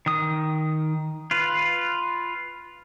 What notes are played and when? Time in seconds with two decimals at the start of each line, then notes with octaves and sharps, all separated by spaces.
0.06 D#3 D#6
1.31 F4 B4